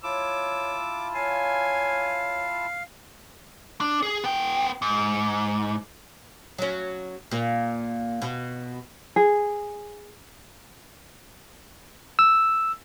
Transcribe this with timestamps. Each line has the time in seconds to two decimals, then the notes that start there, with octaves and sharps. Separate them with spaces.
0.03 E4 F4 C#5 A5 D6 E6
1.14 C#5 F5 G#5
3.81 D4
4.03 G#4
4.24 B3 G5
4.82 G#2
6.58 F#3 C#4
7.31 A#2
8.22 B2
9.16 G#4
12.19 E6